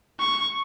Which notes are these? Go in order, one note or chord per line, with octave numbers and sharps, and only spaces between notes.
C#6